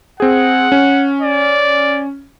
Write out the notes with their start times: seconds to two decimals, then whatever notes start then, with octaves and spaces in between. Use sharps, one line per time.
0.20 C4 G#4 F#5
0.72 C#4
1.21 D5